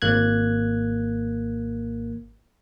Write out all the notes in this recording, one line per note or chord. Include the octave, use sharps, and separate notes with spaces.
G#1 A#3 F#6 G#6